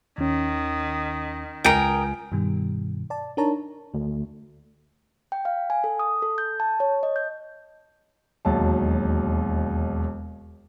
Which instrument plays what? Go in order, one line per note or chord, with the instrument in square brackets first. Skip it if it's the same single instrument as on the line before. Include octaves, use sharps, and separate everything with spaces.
[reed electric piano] D#2 C#4 [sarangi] D#3
[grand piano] C#2 G#5 D7 [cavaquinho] A#4 D#5 G5
[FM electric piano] G2 B2 D#3 G3
D5 A5
D4 D#4 A#4 C#5 A5 A#5
[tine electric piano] D2
[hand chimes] G5
F5
G#5
A4
D#6
A4
G6
A5
C#5
D#5
G6
[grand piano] E1 D#2 F#3 A5